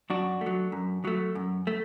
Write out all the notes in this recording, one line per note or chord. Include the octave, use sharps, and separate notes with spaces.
F#2 D4 F#4
A3
F#3
F#2
F#3 A3
F#2
A3